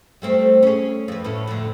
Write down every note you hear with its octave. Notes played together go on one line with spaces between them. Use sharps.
G3 A3 C4
C#4 G#4
F2 B4
A2 C#4 E4
F2 A2 D3